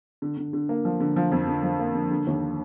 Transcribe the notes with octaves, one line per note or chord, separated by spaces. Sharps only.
D3
D3
D3
A#3
F3
D3
F3
F2
D3
F3
A#3
D3
D3
D#2